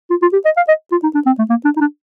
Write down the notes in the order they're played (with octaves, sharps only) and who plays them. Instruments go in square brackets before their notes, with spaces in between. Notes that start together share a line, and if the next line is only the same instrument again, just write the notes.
[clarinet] F4
F4
G4
D#5
F5
D#5
F4
D#4
D4
C4
A3
A#3
D4
D#4
D4